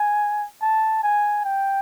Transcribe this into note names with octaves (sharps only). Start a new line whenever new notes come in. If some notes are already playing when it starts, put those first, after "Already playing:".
Already playing: G#5
A5
G#5
G5